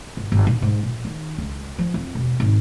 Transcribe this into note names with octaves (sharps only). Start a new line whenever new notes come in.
G1
G1
A#2
G#2
A#1
D#3
C#2
F3
F2
E1
G#1